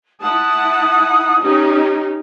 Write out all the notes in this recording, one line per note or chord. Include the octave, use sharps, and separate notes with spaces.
E4 F#5 A5 D#6
C#4 D#4 G4